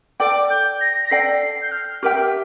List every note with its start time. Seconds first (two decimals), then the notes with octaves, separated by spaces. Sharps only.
0.20 A4 D5 G5 D6
0.50 G6
0.81 A#6
1.05 A#6
1.11 A4 D5 G5 C7
1.41 C7
1.62 G6
1.72 F6
2.02 G4 A#4 E5 G5 F6